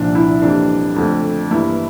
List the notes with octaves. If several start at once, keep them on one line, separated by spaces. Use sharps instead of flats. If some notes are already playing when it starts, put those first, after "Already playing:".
Already playing: C2 A#2 F3 D4
E4
F2 E3 G3 A#3 D4
F2 D3 A3
G2 E3 A#3 E4